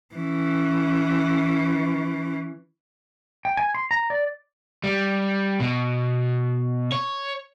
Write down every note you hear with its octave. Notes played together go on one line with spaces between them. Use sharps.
E3 C#4
G5
G#5
C6
A#5
D5
G3
B2
C#5